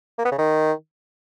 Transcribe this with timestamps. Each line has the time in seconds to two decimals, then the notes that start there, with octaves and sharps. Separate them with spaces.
0.18 A#3
0.25 B3
0.32 C#3
0.38 D#3